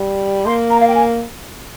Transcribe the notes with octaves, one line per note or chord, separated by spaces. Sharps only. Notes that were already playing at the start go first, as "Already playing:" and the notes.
Already playing: G3
A#3 C6
A#5
F5
G5
G#5